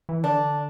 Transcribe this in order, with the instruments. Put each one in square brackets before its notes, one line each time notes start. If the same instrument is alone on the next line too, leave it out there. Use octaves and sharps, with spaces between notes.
[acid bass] E3
[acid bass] D3 [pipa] D4